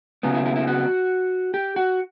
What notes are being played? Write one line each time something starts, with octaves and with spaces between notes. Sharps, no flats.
C#3 F#3 B3
E4
E4
E4
F#4
G4
F#4